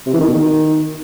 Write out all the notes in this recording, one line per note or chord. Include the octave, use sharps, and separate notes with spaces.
C3
E3
D#3
B2
D#3